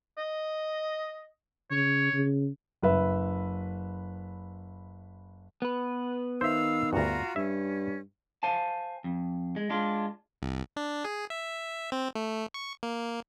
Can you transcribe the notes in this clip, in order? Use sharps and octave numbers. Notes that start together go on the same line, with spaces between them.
D#5
C#3 C#5
C#3
F#1 B4 E5
B3 B4
D#3 C5 E5 F5 E6
D2 G2 F4 F#4 A#5
G2 C#4 E5
C5 F5 G#5 A5
F2
G#3
G#3 D4 F4
C2
D4
G#4
E5
C4
A3
C#6
A#3